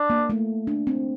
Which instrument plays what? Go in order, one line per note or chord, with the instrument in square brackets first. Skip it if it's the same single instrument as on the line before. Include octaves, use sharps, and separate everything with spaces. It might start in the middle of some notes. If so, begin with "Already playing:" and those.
Already playing: [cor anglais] D4
[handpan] A#3
A3
D4
C4